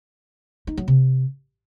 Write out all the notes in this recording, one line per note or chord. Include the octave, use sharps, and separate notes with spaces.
D#4
F#3
C3